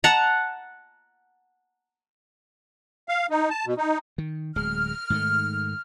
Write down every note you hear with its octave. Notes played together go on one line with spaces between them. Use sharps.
F#5 A5 A#5
F5
D#4
A5
B2
D#4
D#3
D1 G#3 F6
G#2 D#3 A3